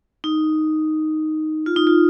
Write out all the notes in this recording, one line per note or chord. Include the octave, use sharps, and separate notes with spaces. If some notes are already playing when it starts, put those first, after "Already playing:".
D#4
F4
D#4
F4